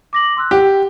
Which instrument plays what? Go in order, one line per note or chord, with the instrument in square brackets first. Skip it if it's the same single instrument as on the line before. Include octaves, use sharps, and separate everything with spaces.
[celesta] D6 A#6 F#7
C6 E6 F#6
[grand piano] G4 [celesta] F#5